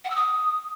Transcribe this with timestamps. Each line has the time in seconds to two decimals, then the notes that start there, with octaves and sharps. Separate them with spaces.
0.04 F#5
0.09 E6
0.15 D#6